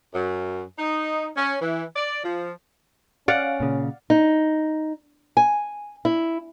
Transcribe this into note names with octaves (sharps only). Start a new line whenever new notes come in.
F#2
D#4
C#4
E3
D5
F3
C#4 D5 F5 F#5
A#2 C#3
D#4
G#5
E4